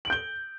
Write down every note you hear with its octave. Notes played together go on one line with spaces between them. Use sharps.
G6 D7 F#7 G7